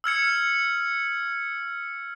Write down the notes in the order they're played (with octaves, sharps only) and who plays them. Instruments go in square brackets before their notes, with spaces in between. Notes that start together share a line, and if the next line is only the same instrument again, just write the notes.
[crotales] E6 F6 G#6 C#7